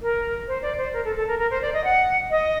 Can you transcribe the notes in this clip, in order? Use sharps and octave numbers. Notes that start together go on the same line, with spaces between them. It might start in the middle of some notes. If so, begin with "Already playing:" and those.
A#4
C5
D5
C5
A#4
A4
A4
A#4
A#4
C5
D5
D#5
F#5
D#5